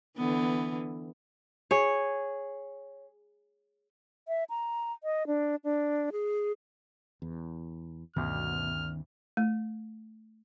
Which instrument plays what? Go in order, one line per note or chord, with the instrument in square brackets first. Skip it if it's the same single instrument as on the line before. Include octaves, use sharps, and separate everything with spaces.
[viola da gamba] D3 E3 B3
[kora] G#4 C#5
[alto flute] E5
A#5
D#5
D4
D4
G#4
[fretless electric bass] E2
[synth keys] D2 G2 [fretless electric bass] B2 [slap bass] D#3 B3 C#4 [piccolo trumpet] F6
[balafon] A3